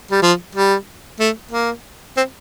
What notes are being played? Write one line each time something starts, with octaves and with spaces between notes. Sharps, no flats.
G3
F3
G3
A3
A#3
C4